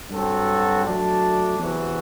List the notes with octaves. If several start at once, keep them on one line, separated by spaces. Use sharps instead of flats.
G2 F#3 C4 F#4 A4
F#3 A3 D4
E2 C3 E3 B3 F#4